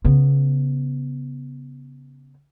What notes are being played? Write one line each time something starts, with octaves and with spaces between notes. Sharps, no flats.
C#3 B3